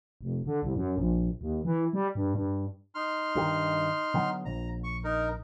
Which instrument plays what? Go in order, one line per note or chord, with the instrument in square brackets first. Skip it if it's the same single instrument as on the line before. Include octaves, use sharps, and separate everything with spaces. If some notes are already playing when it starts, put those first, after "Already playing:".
[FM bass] F1
D3
C2
F#2
A#1
D#2
E3
G3
G2
G2
[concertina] D#4 C6 F6
[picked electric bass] G2 D#3
D3 F#3 B3
[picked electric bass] A#1 [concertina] A#5
[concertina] C#6
D#4 A#4